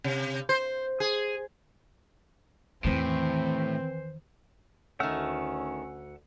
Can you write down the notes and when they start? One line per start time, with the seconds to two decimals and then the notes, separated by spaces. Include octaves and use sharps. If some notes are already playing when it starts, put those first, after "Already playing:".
0.04 C3
0.49 C5
1.00 G#4
2.84 E2 A2 D#3 E3 C4 C5
5.00 D2 D#3 A3 C#4 F#5 E6 F6